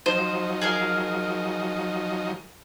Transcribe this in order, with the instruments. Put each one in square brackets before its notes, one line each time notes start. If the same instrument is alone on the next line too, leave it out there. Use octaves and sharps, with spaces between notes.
[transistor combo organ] F3 F#3 D#4 [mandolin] C5
[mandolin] G#4 A#4 F5